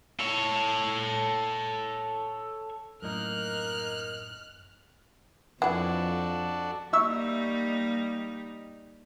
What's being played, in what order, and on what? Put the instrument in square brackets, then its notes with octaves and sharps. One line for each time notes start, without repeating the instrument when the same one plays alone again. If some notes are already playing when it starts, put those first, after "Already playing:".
[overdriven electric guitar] A4 C#5
[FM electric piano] F#2 A2 D#5 [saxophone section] A#3 D#4 A#4 [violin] F6 F#6
[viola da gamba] F2 [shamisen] E3 B4 [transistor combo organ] D4 F#4 A4 [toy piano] F#5
[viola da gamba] G3 A#3 D#4 [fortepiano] E5 C#6 E6